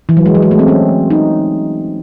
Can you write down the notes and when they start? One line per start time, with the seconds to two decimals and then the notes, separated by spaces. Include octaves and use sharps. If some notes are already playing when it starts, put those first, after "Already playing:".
0.09 E3
0.17 F#3
0.26 G#3
0.35 F#3
0.42 G#3
0.51 A3
0.59 C4
0.68 C#4
1.11 D#4